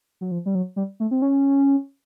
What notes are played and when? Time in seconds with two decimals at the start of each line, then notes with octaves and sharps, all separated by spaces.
0.21 F#3
0.31 F3
0.46 G3
0.55 F#3
0.76 G3
1.00 A3
1.11 C4
1.22 C#4